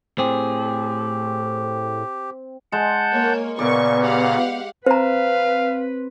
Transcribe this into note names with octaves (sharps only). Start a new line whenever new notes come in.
A2 C4 G4 G#4
G#3 F#5 A5 G6
A#3 C#5
A#2 C#3 B3 D5 C#6
G4 F5 F#5
C4 B4 C5 F5 A#5